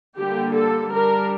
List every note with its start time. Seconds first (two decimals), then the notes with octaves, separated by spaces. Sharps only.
0.17 D3 G3 A#3 G4
0.54 A4
0.91 G3 D4 A#4